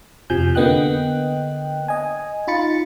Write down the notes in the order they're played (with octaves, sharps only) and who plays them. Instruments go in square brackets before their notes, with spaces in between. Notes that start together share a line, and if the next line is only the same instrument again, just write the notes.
[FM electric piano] F2 C3 F3 G#5 G6
D3 A#3 B3 D#5 G5 F#6
D#5 G#5
D#4 F4 B5 A6 C#7